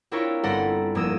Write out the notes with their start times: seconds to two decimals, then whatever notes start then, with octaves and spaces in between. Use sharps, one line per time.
0.11 C4 D4 E4 F4 A#4 C#5
0.43 G1 A4 D5 F#5 A#5
0.95 F1 A#3 D#6 E6